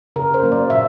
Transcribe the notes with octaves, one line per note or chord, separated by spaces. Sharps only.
C#3 A#4
C5
F#3 A#3
D5
A#2 E5